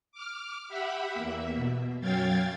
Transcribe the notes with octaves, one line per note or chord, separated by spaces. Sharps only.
D6 F6
G4 E5 F#5 B5
E2 A#3 E5
B2
F#2 F#3 F5 G5 G#6 A6